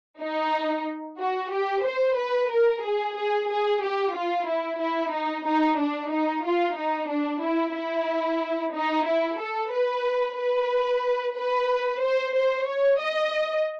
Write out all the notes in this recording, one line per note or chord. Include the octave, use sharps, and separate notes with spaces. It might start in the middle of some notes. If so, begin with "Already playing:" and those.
D#4
F#4
G4
C5
B4
A#4
G#4
G#4
G#4
G4
F4
E4
E4
D#4
D#4
D4
D#4
F4
D#4
D4
E4
E4
D#4
E4
A4
B4
B4
B4
C5
C5
C#5
D#5